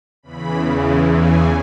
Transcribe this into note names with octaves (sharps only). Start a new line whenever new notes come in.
E2 C#3 E3 B5
G#5